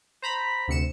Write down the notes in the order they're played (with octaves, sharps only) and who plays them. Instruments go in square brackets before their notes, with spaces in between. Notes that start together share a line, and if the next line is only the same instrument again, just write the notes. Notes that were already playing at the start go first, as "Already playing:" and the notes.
[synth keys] C5 A#5 B5 B6
D2 C3 C#7 E7